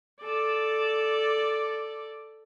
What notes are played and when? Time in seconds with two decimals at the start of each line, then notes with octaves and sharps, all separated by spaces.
0.22 A4 D5